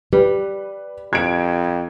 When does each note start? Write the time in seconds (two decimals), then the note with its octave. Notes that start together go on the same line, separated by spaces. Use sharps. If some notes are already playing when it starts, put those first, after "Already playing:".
0.13 G3 B4
1.13 F2 G#6 D7